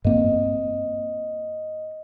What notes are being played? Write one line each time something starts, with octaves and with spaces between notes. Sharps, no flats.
G2 A#3 C4 D#5